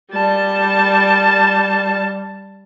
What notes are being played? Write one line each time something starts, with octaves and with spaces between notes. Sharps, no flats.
G3 A5